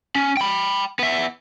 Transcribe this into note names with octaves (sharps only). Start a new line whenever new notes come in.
C#4
G5 B5
B3 E5